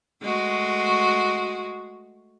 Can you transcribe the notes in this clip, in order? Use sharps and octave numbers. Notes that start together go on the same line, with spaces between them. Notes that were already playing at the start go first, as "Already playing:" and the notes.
G#3 A3 F#4